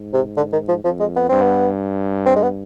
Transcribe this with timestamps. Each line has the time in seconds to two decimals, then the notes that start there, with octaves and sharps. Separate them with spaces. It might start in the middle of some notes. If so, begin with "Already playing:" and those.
Already playing: G#2
0.14 C3
0.37 D3
0.53 D#3
0.69 F3
0.84 F2 F3
1.00 G#3
1.16 B3
1.29 G2 C4
1.42 B3
2.26 C4
2.36 G#3
2.43 B3